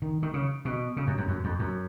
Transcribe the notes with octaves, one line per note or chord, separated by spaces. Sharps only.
D#3
D#3
C#3
B2
C#3
F#2
F#2
F#2
F2
F#2